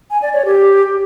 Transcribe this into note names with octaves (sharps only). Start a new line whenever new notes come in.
G#5
D5
C#5
G4